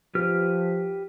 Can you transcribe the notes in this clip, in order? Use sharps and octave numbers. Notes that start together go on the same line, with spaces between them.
F3 G4 B4 F6